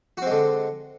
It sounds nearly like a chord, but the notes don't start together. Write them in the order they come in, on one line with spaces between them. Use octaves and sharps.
F#4 C4 G#3 D3